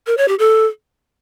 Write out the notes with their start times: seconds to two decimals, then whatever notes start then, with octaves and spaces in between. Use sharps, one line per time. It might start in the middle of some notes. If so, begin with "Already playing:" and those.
0.07 A#4
0.17 C#5
0.28 G4
0.39 A4